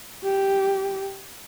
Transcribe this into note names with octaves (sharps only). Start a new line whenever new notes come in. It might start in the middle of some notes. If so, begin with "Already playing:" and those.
G4